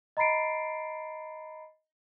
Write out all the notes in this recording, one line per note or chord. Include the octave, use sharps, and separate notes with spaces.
D#5 A#5 B5 A6 C7 D7